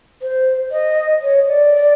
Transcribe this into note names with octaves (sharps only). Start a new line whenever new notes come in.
C5
D#5
C#5
D5